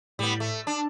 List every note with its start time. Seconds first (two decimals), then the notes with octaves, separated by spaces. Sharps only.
0.19 A2 G3 B3
0.40 A3
0.67 D4 A5